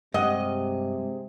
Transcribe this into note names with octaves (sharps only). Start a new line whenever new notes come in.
G2 C3 G#3 D#5 F#5